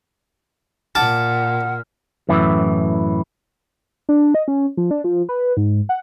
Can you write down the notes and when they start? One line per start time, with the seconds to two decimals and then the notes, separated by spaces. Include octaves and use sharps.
0.95 A#2 F#5 A5 D6 F6
2.29 F#2 A2 E3
4.09 D4
4.35 D#5
4.48 C#4
4.77 F3
4.91 D4
5.04 F3
5.29 B4
5.57 G#2
5.89 F#5